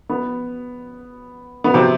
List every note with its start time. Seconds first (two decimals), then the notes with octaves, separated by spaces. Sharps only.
0.09 B3
1.64 B3
1.74 C3 C4